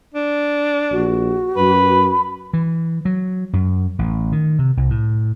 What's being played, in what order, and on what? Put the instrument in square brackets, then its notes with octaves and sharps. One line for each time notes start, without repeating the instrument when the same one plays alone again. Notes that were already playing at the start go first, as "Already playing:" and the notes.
[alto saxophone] D4
[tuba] A#1 [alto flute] F#4
[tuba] F#2 [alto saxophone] B4 [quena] B5
[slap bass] E3
F#3
F#2
A1
D#3
C3
C2
A2